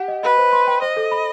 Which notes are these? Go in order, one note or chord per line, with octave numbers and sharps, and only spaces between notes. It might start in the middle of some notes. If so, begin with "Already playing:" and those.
Already playing: G4 F#5
D#5
B4 D#5
C5
C6
G5
C5 D#5
A4
B5